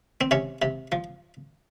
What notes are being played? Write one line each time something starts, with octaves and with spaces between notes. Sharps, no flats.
C4
C3 C#4
C3
F3